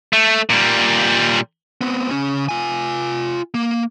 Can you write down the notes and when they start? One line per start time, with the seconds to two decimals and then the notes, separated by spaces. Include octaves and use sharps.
0.13 A3
0.50 A#2 G3
1.81 B3 C4
2.11 C#3 C#4
2.49 F4 G#5
3.54 A#3